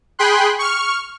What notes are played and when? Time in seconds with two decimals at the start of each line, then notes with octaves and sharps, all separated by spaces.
0.19 G#4 G5 B5 C6 F#6
0.59 C#6 F6